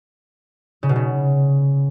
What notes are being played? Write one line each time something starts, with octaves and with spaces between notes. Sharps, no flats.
C#3
B2
C#3